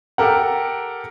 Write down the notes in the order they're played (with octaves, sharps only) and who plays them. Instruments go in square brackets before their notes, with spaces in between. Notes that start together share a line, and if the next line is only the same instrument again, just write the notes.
[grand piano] G4 A4 A#4 F#5